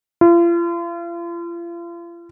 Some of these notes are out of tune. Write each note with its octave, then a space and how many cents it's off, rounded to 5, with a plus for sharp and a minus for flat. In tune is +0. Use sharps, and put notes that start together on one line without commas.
F4 -40